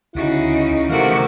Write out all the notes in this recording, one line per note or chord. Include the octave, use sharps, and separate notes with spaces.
D2 C#3 D#4 E4 F#4
C3 D#3 E3 A3 F#4 A#4 F5